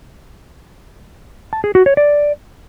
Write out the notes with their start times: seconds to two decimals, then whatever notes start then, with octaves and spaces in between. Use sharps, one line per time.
1.53 A5
1.64 G#4
1.75 F#4
1.86 C#5
1.97 D5